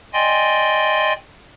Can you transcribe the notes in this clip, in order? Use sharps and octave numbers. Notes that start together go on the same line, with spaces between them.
D5 D#5 G5 G#5 C6